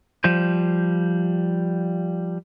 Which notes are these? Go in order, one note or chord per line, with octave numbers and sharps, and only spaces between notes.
F3 G3 C5